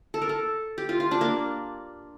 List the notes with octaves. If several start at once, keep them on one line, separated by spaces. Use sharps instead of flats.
A4
A#4
A4
G4
F4
F4
D4
A#3